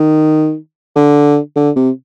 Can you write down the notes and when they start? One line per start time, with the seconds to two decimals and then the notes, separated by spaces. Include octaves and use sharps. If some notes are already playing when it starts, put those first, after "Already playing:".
Already playing: D#3
0.96 D3
1.56 D3
1.76 C3